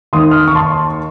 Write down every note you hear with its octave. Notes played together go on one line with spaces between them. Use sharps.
D#2 D#3 C6 D#6
F6
D#6
C#6
A5 C6